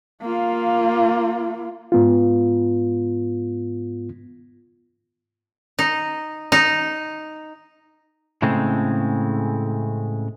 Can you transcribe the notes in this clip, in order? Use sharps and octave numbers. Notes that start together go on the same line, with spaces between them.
A#3 F4
G#2 B3 F4
D#4
D#4
A2 C#3 G#3 A3 C4